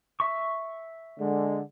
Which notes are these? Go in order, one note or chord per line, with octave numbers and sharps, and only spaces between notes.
E5 C#6
D3 G#3